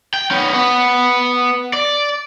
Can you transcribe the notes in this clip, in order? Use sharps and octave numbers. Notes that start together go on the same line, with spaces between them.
G5
B3 C#4
B3
D5